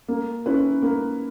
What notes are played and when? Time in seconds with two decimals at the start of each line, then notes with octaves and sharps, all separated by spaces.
0.08 A#3
0.46 C#4 E4 B4
0.82 A#3